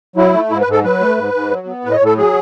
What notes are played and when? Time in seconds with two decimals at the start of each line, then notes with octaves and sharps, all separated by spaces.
0.16 F#3 E4
0.33 A3
0.50 G#2 E4
0.61 B4
0.67 G#2
0.72 A4
0.84 F#3 B4
1.01 A3
1.17 G#2
1.34 G#2
1.50 F#3
1.67 B3
1.85 A2 B4
1.91 D#5
1.96 C#5
2.00 A2
2.06 A4
2.18 F#3 G#4